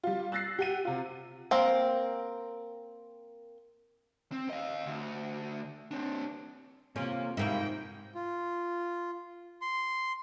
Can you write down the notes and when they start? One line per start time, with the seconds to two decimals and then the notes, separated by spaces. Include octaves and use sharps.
0.03 G3 F4
0.32 E6 F#6 A6 A#6 C7
0.59 G4 F#5 D#7
0.85 C3 F4
1.51 A#3 C4 A#4
4.32 C4
4.50 D#5 F5
4.86 D2
5.91 C4 D4
6.96 C3 A#3 C#4 F4
7.37 G#2 C3 A#3 E4 G5
8.15 F4
9.62 C6